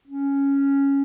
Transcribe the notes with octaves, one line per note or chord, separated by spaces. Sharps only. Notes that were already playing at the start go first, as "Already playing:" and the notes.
C#4